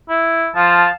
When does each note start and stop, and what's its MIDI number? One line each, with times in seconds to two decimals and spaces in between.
0.09 0.49 64
0.56 0.85 53
0.56 0.91 77
0.56 0.91 81